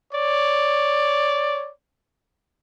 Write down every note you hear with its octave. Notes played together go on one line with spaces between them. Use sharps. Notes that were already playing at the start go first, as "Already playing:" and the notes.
C#5 D5